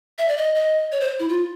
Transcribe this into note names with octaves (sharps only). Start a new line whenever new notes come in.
E5
D5
D#5
D#5
C#5
C5
E4
F4